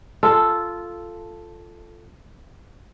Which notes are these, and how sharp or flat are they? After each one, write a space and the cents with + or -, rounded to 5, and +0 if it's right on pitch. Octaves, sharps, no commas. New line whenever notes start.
F4 -5 A4 +0